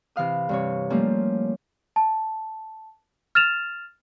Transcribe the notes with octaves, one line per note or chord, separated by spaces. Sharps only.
C3 E3 F5 D#6
G2 C3 C#5
F3 G3 A3 A#3 C#4
A5
F6 A6 E7 F7